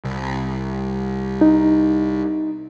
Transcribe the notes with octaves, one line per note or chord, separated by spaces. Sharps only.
C2
D#4